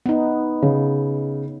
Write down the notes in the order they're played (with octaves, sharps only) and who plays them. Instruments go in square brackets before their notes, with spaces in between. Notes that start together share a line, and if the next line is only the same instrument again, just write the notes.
[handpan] B3 D#4
[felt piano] C#3